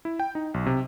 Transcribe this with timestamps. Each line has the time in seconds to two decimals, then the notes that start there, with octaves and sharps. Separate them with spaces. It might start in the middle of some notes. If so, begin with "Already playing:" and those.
0.05 E4
0.20 G5
0.35 D#4
0.54 B1
0.66 C3